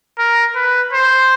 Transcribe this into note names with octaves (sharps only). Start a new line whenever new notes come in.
A#4
B4
C5